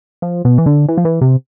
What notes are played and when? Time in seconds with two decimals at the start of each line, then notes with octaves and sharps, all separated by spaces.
0.22 F3
0.45 B2
0.58 E3
0.66 D3
0.88 E3
0.97 F3
1.05 E3
1.21 C3